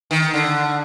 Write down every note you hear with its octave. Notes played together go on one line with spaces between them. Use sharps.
D#3
D3